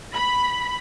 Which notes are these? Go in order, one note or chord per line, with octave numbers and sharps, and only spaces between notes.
B5